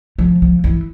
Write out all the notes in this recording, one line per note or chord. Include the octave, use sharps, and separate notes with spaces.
F3
F3
E3